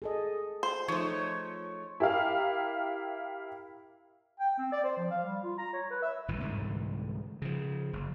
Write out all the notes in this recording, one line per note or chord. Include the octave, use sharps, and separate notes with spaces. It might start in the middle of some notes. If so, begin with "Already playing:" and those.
G#4 A4 D#5
C5
F3 A3 D#4 C#5
E4 G4 A#4 F5
G5
C4
D5
C5
F3
F5
G3
F4
A#5
C#5
B4
E5
G1 A2 E3
C2 G#2 D3 E3
C#3 F3
F#1